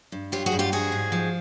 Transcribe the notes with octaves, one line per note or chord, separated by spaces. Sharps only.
G2
F#3 F4 G4
F#4 G#4
G2
F4 G4
F3 F#4 G#4
G#2
F3